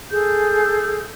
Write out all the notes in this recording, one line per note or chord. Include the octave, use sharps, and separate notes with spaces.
G#4 A4 G6